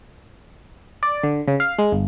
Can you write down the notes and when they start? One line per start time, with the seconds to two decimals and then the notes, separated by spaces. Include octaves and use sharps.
1.03 D5
1.23 D3
1.48 C#3
1.60 F5
1.79 G#3
1.92 G1